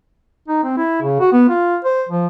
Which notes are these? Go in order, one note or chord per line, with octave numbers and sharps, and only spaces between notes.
D#4
C4
E4
C#3
F#4
B3
F4
C5
F3